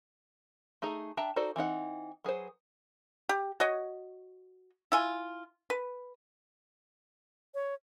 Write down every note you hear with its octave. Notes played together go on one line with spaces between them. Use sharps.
A3 D#4 G#4 A#5
D4 E5 G5 A5 A#5
D#4 F#4 A4 C5 D5
E3 C4 D#4 F#5
F#3 G#4 B4 C5
G4
F#4 C#5 D#5
E4 F4 G#5
B4
C#5